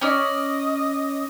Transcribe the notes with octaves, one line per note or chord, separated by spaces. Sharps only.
C#4 D5 D#5 D#6